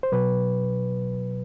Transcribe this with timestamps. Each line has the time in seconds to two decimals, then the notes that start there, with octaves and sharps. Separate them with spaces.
0.03 C5
0.12 B2 F#3 B4